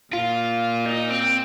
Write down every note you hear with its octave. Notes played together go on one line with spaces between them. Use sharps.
A#2 F4
D#4
C4